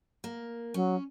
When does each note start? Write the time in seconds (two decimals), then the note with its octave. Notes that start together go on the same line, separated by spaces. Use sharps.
0.24 A#3
0.74 F#3 C#4